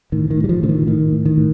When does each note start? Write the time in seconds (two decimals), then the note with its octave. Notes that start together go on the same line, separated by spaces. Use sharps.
0.12 A2 D#3
0.30 D#3
0.37 A2
0.44 G3
0.49 F3
0.63 A2 D3
0.69 D#3
0.87 A2 D#3
1.12 A2
1.26 D#3
1.38 A2